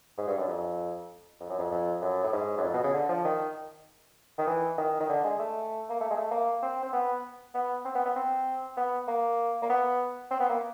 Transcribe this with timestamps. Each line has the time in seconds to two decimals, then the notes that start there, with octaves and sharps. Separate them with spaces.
0.18 G#2
0.28 G2
0.38 F#2
0.48 F2
1.40 F2
1.50 F#2
1.59 F2
1.71 F2
2.02 F#2
2.24 A2
2.33 G#2
2.58 F#2
2.63 F2
2.73 B2
2.84 C#3
2.94 D3
3.09 F3
3.25 D#3
4.38 D#3
4.47 E3
4.78 D#3
5.00 D#3
5.09 D3
5.24 G#3
5.40 A3
5.90 A#3
6.01 A3
6.11 G#3
6.16 A3
6.31 A#3
6.63 C4
6.83 C4
6.93 B3
7.54 B3
7.85 C4
7.95 B3
8.06 B3
8.16 C4
8.77 B3
9.08 A#3
9.62 A#3
9.69 B3
10.31 C4
10.40 B3
10.49 A#3